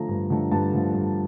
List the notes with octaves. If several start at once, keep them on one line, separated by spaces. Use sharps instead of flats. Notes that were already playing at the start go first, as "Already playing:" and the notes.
Already playing: D3 F3 A3 A#5
G2
D3 F3 A3
G2 A5
D3 F3 A3
G2